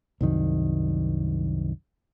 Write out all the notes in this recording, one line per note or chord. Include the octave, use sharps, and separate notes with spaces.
C2 F#2 D#3